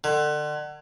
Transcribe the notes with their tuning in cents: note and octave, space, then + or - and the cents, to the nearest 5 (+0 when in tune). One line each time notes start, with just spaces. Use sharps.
D3 +35